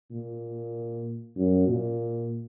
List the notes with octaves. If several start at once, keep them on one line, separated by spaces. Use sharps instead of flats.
A#2
F#2
A#2